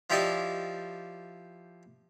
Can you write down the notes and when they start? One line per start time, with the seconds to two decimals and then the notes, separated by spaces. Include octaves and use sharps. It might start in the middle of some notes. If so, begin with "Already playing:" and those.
0.10 F3 E4 G4 D5 D#5 C#6